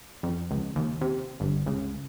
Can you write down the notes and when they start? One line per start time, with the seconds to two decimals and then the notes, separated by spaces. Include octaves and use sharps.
0.23 F2
0.51 C#2
0.76 D#2
1.01 C3
1.40 G1
1.66 C#2